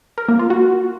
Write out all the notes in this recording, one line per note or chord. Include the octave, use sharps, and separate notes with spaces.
A#4
A#3
F4
F#4